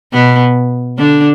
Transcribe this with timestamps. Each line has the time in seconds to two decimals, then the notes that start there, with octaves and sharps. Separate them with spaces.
0.13 B2 B3
0.98 D3 D4